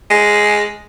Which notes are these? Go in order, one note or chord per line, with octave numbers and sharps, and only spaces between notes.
G#3